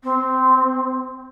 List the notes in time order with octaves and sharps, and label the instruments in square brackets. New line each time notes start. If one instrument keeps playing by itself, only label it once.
[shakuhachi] C4